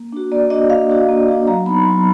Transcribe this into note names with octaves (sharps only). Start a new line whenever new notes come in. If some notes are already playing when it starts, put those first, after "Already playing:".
Already playing: A#3
D4 F#4
A#3 D5
D4 F#4 D#5
A#3 F5
D4 F#4
A#3
D4 F#4
F#3 A#5
B3 D#4 B5
F#3 C6